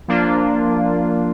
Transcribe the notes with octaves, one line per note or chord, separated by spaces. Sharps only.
F3 A#3 D4 F4